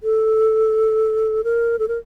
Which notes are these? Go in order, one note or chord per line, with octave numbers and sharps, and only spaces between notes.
A4
A#4
A4
A#4